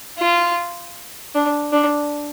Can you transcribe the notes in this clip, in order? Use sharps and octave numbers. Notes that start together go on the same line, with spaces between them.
F4
D4
D4